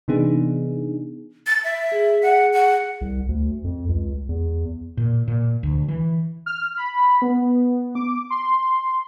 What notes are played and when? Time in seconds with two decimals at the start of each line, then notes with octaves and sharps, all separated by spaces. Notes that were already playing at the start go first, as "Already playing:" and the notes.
0.08 C3 E3 B3 D4 D#4 G#4
1.47 A6
1.64 E5
1.92 G#4
2.23 F#5
2.53 F#5
3.01 C2
3.29 D2
3.64 F2
3.88 C#2
4.29 E2
4.97 A#2
5.28 A#2
5.63 D2
5.88 E3
6.46 F6
6.77 B5
7.22 B3
7.95 D6
8.30 C6